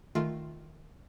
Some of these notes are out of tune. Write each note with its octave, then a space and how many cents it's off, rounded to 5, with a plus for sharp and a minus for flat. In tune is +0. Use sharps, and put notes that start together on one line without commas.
D#3 +0 A3 +0 F4 +0